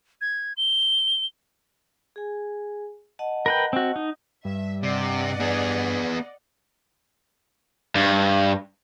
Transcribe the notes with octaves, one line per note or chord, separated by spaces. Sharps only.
G#6
G7
G#4 G#5
D#5 F#5 A5
A#4 B4 G5
C4 F#4
D#4
G2 E5
C3 D5 D#5 F#5
B3 G#4
G2